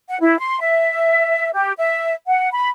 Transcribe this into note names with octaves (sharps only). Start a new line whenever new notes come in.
F#5
E4
C6
E5
G4
E5
F#5
B5